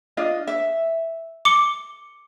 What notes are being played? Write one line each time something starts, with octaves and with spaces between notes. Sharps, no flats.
D4 F4 D#5
E5
D6 C#7 G7